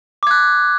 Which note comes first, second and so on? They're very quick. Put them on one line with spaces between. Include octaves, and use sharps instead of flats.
D6 G#6 F#6